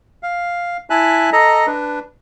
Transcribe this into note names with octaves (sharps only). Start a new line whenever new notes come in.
F5
E4 E5 G#5 A5 F#6
A4 D#5 A#5
D4 B4